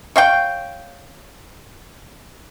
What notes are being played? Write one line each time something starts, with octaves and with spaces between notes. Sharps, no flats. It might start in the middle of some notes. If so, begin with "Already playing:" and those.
C#5 F5 G5